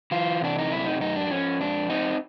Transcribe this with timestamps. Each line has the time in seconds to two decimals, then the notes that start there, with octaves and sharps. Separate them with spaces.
0.11 E3 F4
0.42 C3 D4
0.58 D#4
0.72 F#2 E4
0.86 D#4
1.01 F#2 D#4
1.16 D4
1.30 F3 C#4
1.61 F2 D4
1.90 C4 D#4